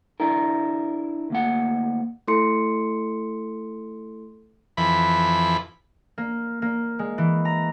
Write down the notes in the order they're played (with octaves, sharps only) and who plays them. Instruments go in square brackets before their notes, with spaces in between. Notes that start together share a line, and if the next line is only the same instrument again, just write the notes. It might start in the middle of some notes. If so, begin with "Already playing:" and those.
[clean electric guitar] D4 E4 A#4
D2 A#3 F#5
[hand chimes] A3 E4 A4 C6 C#7
[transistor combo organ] F2 E3 B5
[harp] A#3
A#3
G#3
E3
A#5